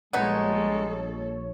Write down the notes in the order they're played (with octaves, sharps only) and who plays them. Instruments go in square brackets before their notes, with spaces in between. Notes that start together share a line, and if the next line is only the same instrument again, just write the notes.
[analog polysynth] A#1 C#5 [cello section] F3 G3 A4 [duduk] G#3 [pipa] B3 D#4